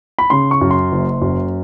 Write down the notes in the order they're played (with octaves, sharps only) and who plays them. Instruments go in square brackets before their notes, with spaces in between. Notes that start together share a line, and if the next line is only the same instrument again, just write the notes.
[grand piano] B5
C#3 C6
C#6
F#2
C6
F#1
F#2